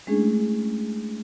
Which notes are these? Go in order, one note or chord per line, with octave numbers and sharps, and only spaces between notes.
G#3 A3 C#4 D4 E4 G#4